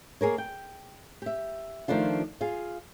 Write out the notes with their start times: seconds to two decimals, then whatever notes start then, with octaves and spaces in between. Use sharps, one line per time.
0.21 A#3 G#4 A#4 C#5
0.38 G5
1.22 G4 E5
1.88 D#3 F3 A3 D4 F4
2.41 F4 G#4 F5